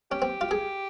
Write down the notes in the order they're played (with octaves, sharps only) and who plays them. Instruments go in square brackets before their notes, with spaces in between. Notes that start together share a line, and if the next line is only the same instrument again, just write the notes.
[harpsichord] C#4 [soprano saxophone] G4
[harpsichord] C4
F4
G#4